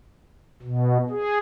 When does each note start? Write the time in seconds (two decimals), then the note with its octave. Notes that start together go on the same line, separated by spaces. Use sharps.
0.62 B2
1.10 G#4